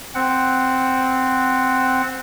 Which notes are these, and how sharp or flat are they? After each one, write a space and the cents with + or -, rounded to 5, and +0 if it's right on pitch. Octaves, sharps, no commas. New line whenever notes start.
C4 -5 F#5 +0